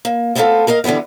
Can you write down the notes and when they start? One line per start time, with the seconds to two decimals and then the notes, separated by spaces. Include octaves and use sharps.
0.05 A#3
0.35 A3 B3 C4 D#4 F4 A4
0.67 A#3 A#4 D#5 F5
0.84 D3 E3 G3 B3 E4